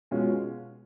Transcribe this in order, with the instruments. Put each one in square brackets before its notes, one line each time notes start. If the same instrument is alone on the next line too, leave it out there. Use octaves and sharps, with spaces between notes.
[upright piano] B2 G#3 C#4 F4